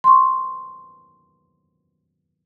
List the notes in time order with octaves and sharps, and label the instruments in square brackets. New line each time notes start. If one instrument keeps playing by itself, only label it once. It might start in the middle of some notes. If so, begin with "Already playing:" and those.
[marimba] C6 C#6